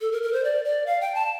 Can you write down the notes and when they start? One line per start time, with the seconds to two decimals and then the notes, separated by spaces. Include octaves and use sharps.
0.01 A4
0.12 A#4
0.23 A#4
0.33 C5
0.44 D5
0.65 D5
0.86 F5
1.01 G5
1.15 A5